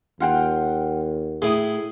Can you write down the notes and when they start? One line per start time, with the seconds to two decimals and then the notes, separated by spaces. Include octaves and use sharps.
0.20 D#2 F4 F#5 G5
1.42 A2 E4 G#4 D#6